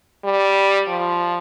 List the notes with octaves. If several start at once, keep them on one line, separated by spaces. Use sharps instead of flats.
G3
F3